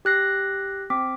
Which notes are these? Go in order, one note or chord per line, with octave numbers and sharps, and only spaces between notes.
G4 F#6 A#6 C7
C4 D6 B6